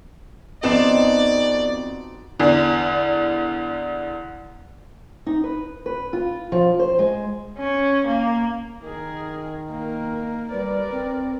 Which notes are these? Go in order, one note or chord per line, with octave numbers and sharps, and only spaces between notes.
F2 B3 D#4 F#4 C5 D5 E7
E2 D3
D#4
B4
B4
F4
F3
C5
G#3
C#4
A#3
D#3 G#4 A#4
A#3 A#4
G3 A#4 B4 D5
C4